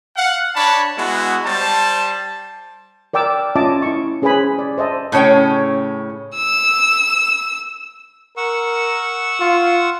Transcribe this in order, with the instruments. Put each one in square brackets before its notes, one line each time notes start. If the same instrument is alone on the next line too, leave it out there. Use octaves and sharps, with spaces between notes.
[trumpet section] F5 F#5
D4 C#5 A5 B5
G#3 B3 E4 F#4
G3 C5 A5
[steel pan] A#4 D5 G5 D6 E6
C#4 F4 D#5 E5 A5 D6
E4 C#6
C#4 G#4 B4 C5 G#5 B5
D5
C5 D#5 E5 A5
[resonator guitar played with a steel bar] A2 C#3 C#4 C#5 G5
[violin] E6
[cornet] A#4 [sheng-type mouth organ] F#5 C#6 E6
[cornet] F4